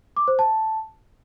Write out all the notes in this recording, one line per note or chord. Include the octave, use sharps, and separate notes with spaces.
D6
C5
A5